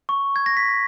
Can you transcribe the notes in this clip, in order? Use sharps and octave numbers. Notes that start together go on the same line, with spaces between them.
C#6
G#6
A#6
B6